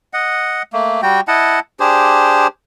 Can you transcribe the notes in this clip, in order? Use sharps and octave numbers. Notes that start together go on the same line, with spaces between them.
D#5 F#5
A3 A#3
G3 F#4 G5
E4 D#5 F#5 A5
D4 G4 G#4 C5